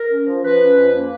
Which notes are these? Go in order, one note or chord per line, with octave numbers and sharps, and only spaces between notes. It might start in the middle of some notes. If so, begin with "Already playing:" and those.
Already playing: A#4
C#4
F3
F3 B4
C#4
F2
A#3